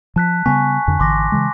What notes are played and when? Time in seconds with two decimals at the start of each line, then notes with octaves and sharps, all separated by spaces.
0.16 F3 A5 F#6 B6
0.46 C#3 G3 B3 G#5 C#6 B6
0.87 F2 D3
0.99 G#1 D3 E3 C6 D6 A#6
1.32 C#3 E3 G#3